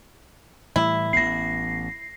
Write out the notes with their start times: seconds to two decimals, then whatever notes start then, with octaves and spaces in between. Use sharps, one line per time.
0.76 A2 E3 G3 E4
1.13 A1 B3 A#6 C7